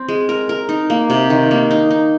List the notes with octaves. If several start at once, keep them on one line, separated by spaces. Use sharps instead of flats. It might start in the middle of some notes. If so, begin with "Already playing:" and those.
Already playing: C4
G#3
A#4
A#4
D#4
A#3
C3
D#3
A#3
D#4
D#4